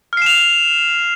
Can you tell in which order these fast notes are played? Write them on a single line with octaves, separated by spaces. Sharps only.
F6 C7 E7 F7